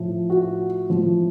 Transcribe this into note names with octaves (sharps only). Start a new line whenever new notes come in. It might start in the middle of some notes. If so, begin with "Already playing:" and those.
Already playing: A2 F3
F#4
A2 F3